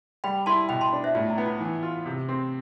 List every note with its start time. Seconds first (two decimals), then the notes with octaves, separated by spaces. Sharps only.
0.24 G3 G5 B5
0.46 E4 A5 C6
0.69 B2 G5 B5
0.81 A5 C6
0.93 D4
1.04 C5 E5
1.15 A2 F4
1.30 E4
1.38 B3
1.46 F4
1.60 E3
1.83 F4
2.06 C3
2.29 C4